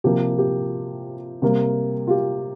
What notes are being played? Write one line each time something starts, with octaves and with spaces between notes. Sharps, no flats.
C3 F3 A#3 G4
G4
C3 G3 A#3
F4
G4